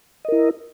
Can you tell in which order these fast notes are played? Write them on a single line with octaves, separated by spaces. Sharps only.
D#5 A#4 E4